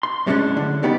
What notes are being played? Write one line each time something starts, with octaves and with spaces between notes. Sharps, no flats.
C6
F#2 A2 G3 G#3 C#4 D4
D3
C2 D#3 B3 G4 D5 B5